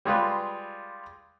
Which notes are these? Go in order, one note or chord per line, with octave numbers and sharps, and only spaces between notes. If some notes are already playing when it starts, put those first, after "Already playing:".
G3 G#3 F4 B4